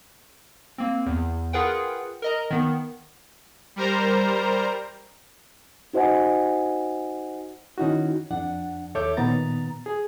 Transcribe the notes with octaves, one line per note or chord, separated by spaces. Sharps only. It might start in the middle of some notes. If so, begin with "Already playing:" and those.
A#3 C4
E2
F4 G#4 A#4 B4 F#5 G5
A#4 D#5 A#5
D#3 B3
G3 A#4 C5 A#5
D#4 F#4 C5 D#5 F#5 G#5
D#3 C#4 D#4 E4 F#4
F2 D4 F#5
D#2 A4 C#5 E5 D6 G6
A#2 D#3 B3 A#5 A6
G#4